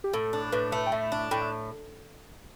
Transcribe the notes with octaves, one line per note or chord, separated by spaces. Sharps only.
G4
A2 A4
D4
A2 B4
A3
G5
A2 E5
D4
A2 G5
E5